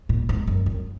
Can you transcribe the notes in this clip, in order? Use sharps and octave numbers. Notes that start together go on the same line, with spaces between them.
A#2
G#2
F#2
F#2